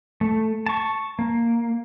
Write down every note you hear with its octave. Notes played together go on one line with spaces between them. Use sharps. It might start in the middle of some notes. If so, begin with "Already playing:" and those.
A3
A5 C#6
A#3